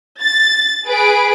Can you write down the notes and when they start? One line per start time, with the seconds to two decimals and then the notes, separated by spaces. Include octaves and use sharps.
0.20 A6
0.86 G#4 B4 D7